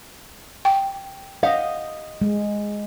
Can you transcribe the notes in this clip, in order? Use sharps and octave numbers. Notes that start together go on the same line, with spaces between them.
G5
G4 D#5 F5 F#5
G#3